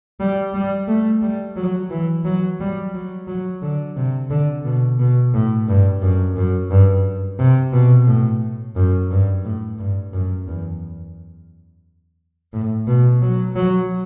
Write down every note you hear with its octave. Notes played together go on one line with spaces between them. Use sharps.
G3
G3
A3
G3
F#3
E3
F#3
G3
F#3
F#3
D3
C3
D3
B2
B2
A2
G2
F#2
F#2
G2
C3
B2
A2
F#2
G2
A2
G2
F#2
E2
A2
B2
F#3
F#3